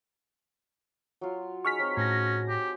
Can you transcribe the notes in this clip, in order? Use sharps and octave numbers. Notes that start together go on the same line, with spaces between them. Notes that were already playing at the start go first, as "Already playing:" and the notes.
F#3 F4
D#4 G#4 G#5 C#6 F6 B6
F#3 C4 C5
A2 C#4 A#6
G4